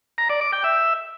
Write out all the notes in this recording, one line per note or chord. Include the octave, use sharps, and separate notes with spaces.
A#5
D5
D6
G5
E5